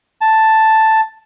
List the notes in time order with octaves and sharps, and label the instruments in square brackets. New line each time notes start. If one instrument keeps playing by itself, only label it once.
[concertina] A5